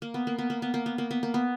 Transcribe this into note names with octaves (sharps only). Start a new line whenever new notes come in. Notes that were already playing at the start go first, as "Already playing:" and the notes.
A#3
B3
A#3
B3
A#3
B3
A#3
B3
A#3
B3
A#3
B3